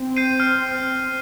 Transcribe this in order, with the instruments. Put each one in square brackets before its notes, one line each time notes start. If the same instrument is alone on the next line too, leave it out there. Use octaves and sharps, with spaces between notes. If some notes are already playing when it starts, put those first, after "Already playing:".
Already playing: [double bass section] C4
[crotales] G6 C7 D#7
F6